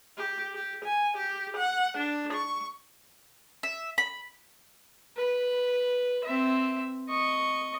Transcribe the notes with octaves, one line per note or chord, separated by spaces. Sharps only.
G4
G4
G#5
G4
F#5
D4
C#6
E5
B5
B4
C4 E5
D#5 C#6